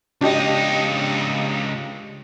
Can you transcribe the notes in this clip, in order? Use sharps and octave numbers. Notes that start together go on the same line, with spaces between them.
C#2 D4 D#4 G4 D#5